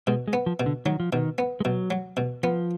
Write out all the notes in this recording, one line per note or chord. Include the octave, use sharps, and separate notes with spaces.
B2 G#3
G#3
B3
F3
B2
D3
D#3 F#3
F3
B2 D#3
B3
G#3
B2 F#3
F#3
B2
F3 B3